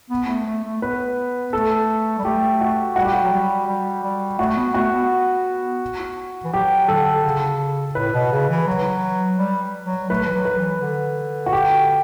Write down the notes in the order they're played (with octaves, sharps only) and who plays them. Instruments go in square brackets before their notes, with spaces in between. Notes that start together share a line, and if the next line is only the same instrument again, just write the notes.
[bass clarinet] B3
A3
A3
A3
[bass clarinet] B3 [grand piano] B4
[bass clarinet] A3 [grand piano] A4
[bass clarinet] G3
[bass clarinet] A3 [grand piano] G4
[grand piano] F#4
[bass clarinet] G3 [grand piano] F#4
[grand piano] G4
F#4
[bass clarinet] F#3
G3
G3
G3
[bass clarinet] A3 [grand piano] F#4
[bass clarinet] B3
[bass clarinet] A3 [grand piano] F#4
[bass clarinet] B3
E3
[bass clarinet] F#3 [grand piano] G4
[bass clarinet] D3 [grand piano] A4
[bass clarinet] C#3
[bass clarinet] A2 [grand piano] B4
[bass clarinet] B2
C#3
E3
F#3
G3
F#3
[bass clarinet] A3 [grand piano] B4
[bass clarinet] E3
F#3
[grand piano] B4
[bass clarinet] E3
D3
[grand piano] F#4
G4